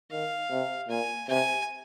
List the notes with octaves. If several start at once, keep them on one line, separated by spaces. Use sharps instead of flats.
D#3 F5
C3
A#2 G#5
C3 G#5